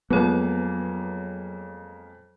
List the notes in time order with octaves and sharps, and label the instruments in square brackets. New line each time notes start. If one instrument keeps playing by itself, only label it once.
[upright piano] F2 G#3 A#3 [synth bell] F#3 C#5 [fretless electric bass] B3